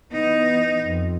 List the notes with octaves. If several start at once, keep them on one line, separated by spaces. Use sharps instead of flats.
E3 B3 D#4
F2